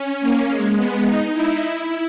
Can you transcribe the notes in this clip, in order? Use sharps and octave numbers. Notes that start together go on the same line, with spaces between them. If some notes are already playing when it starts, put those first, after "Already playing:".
Already playing: C#4
A#3
G#3
B3
D#4
E4
E4